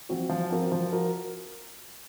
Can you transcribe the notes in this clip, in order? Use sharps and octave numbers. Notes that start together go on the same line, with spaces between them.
F3 C4 F#4
F3
C4 F#4 A#4
F3
F#4 A#4